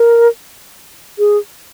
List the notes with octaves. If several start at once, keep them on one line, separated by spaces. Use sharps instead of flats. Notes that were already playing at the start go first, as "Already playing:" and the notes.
Already playing: A#4
G#4